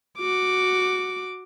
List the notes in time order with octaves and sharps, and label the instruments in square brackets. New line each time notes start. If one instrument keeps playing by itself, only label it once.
[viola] F#4 D6